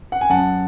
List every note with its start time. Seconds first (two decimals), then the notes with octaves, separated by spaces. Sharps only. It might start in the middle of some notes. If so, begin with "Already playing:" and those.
0.12 F#5
0.21 G#5
0.30 F#2 F#5 A5